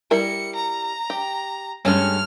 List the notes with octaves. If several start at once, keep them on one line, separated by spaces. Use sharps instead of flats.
G3 E4 A#4 C#7
A#5
G4
G2 G#3 A3 C#4 F6